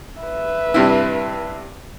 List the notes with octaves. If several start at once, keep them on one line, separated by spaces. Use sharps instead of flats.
B4 E5
G2 C3 E4